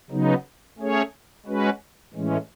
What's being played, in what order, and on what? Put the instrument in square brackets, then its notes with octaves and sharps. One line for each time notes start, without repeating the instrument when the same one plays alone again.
[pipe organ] C#3 F#3 B3 D#4
A3 C#4 G#4 C#5
G#3 C#4 F#4 B4
A2 E3 G#3 C#4